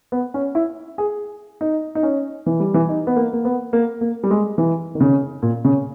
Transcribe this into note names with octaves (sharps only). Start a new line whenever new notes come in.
B3
C#4
E4
G#4
D#4
D#4
C#4
E3
G3
E3
D#4
B3
A#3
A#3
B3
A#3
A#3
G3
G#3
E3
D#3
C#3
A#2
C#3